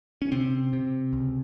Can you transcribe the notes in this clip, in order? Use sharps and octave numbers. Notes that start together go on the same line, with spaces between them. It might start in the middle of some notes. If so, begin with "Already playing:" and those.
C#4
C3 C4
C3
C#2